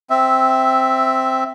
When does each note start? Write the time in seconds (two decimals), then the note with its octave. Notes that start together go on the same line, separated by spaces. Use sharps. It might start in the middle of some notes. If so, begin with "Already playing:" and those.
0.10 C4 E5